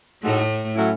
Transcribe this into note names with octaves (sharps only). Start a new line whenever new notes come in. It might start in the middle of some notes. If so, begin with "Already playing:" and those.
A2 G#3 A3 D#4 F#4 A4
A2 F#3 A3 C#4 E4